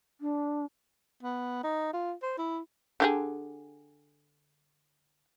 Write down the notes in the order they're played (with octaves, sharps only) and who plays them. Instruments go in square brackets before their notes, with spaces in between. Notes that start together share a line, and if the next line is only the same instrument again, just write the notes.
[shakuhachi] D4
[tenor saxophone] B3
D#4
F4
C5
E4
[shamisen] D3 G4 G#4